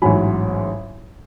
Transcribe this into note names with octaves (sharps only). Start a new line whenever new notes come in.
A1 G#2 F#3 G#5 B5